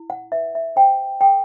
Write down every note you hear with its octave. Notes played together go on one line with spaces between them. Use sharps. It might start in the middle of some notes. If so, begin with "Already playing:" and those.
Already playing: E4
F#5
B4 E5
E5
C5 G5
A4 G5